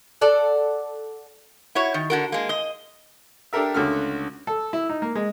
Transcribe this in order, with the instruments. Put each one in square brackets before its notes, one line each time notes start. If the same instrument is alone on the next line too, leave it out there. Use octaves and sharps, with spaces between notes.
[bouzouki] A4 D5 F#5
[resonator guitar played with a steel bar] E4 F#4 C#5
D#3
D3 F#4 A#4
G#3 A#3
D#5
[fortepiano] D4 G4 A4 A#4 E5
C#2 D3 A3 F#4 F6
A4
E4
D#4
A#3
G#3